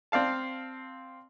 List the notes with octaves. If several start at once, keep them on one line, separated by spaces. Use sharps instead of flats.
C4 D5 F5 A5